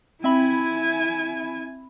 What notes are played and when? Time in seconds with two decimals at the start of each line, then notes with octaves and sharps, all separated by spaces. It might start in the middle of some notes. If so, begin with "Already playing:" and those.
0.24 C4 E4 E5 G#5 B5